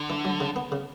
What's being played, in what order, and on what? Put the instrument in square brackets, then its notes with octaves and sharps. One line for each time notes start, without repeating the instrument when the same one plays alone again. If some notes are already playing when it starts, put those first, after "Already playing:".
Already playing: [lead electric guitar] D3
[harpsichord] E3
F#3
C#3
B3
C#3